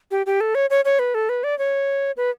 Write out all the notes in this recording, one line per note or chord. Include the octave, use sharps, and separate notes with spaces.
G4
G4
A4
C#5
C#5
C#5
B4
A4
B4
D5
C#5
B4